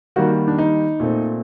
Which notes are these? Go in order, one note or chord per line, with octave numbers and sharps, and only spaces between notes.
D#3 G3 A#3 F#4
D4
D#4
A#2 A3 C4